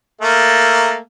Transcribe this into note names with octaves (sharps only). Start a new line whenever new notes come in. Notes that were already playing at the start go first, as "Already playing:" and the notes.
A3 A#3